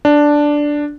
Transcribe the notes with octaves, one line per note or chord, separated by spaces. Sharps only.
D4